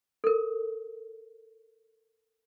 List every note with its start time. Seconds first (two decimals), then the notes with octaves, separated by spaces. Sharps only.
0.24 A4 A#4